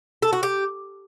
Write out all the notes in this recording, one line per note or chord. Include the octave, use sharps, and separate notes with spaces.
A4
F#4
G4